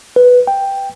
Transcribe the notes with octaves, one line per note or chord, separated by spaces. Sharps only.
B4
G5